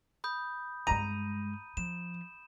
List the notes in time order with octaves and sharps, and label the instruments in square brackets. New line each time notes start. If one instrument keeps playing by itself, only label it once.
[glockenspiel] B5 D#6 G6
[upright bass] G2 G#3 [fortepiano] A#5 [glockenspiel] D#7
[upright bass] F3 [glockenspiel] E7